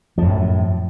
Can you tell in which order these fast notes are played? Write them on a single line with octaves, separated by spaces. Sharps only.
F3 F#2 A2